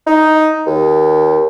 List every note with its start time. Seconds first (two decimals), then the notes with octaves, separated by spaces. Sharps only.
0.07 D#4
0.66 D#2